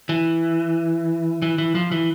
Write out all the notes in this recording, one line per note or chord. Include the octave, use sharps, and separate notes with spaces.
E3
E3
E3
F3
E3